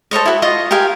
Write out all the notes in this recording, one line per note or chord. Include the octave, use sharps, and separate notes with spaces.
A4 C5 C#5 D#5
E4 F#4
F4 D#5 C#6 D#6
G4 A#4 F5 G#5